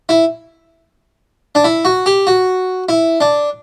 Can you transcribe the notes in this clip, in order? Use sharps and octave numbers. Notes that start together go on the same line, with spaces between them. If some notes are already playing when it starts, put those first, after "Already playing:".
E4
D4
E4
F#4
G4
F#4
E4
D4